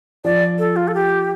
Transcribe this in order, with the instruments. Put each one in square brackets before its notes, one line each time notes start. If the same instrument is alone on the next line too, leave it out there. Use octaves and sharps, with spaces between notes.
[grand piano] F3 [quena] D5
[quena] A4
F4
A4
G4